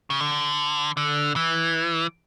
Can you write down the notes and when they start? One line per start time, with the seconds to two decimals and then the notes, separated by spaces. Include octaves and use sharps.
0.10 C#3
0.20 D3
0.97 D3
1.36 E3